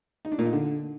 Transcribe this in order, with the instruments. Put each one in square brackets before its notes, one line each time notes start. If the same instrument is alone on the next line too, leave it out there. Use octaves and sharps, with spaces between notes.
[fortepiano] D#4
D4
A#2
D#4
D3